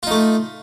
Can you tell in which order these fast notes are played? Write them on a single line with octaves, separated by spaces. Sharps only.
F4 D#4 A3